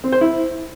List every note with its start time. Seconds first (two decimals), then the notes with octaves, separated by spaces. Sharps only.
0.04 C4
0.12 C5
0.21 E4